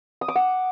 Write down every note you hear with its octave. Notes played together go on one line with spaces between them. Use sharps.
D#6
D6
F#5